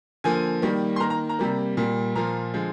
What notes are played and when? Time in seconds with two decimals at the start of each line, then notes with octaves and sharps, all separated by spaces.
0.24 D3 F3 A#3 G#5
0.62 D#3 G3 A#3
0.96 C6
1.00 D#3 A#3 A#5
1.10 A#5
1.29 A#5
1.39 C3 G3 A#3
1.77 A#2 G3 A#3
2.15 A#2 F3 A#3 A#5
2.54 D3 F3 G#3